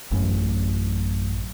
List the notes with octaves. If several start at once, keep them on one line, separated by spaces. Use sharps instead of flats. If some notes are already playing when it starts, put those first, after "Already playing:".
A1 F#2